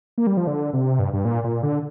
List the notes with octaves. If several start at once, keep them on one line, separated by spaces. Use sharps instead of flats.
A#3
G3
F3
D3
C3
G2
G2
A#2
A#2
D3